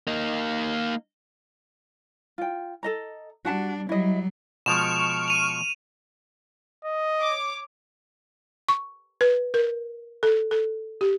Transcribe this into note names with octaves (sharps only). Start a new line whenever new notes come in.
A#3 D#4
F4 G5
A4 D#5 A#5
G3 D4 F#4 F#5 A5
F#3 G3 E4 D#5
B2 F3 G#3 C#6 F6 D7 E7 F7
D#7 F7
D#5
C#5 D6
C#6
B4
A#4
A4
A4
G4